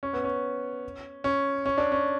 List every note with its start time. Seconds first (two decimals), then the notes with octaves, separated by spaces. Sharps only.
0.03 C#4
0.13 B3
0.24 C#4
1.24 C#4
1.66 C#4
1.78 D4
1.92 C#4